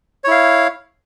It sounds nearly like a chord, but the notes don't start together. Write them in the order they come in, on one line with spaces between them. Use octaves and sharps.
C#5 E4 F5